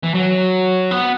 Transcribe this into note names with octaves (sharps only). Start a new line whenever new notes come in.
E3
F#3
B3